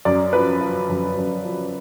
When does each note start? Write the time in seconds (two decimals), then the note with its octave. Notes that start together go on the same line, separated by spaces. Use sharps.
0.05 F#2 D5
0.33 F3 B4
0.61 F3
0.89 F#2
1.17 F#2
1.44 F3